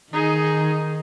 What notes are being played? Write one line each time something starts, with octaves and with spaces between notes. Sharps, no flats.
D#3 D#4 G#4